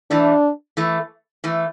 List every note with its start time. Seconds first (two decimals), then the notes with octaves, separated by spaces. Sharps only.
0.11 E3 A3 D4
0.77 E3 A3
1.44 E3 A3